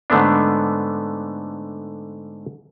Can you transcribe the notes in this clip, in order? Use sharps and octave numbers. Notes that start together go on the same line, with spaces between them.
G#2 D3 A3 B3 D4